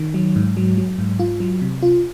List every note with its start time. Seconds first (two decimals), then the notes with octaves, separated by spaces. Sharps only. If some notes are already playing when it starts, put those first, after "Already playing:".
Already playing: D#3
0.14 F#3
0.36 G#2
0.57 F#3
0.77 F#3
0.98 G#2
1.20 F4
1.40 F#3
1.62 C3
1.82 F4